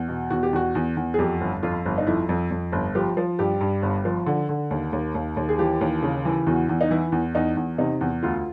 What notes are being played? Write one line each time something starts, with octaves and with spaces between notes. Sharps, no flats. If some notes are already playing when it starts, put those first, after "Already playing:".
Already playing: E2
B2
E2 F#4
G4
E2 F#4
E2
E2
G#4
F2 G4
G1
F2 F4
G1
D#4
F2 E4
F2
F2
G1
F3 G4
F3
G2 G4
G2
G1
F3
D3
D3
D#2
D#2
D#2
D#2
G#4
E3 G4
D#2
C#3
E3
E2 F#4
E2
D#4
E3 E4
E2
E2 D#4
E2
C3 D#4
E2
D2 F4